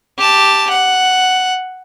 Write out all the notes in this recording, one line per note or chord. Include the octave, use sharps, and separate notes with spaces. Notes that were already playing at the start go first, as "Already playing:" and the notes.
G4 A5
F#5